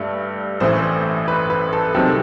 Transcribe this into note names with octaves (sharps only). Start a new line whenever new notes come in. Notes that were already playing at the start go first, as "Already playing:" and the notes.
Already playing: G2 A3
A1 A2 E3 A3 C5
B4
B4
A4
C2 C3 D#3 F#3 C4 A4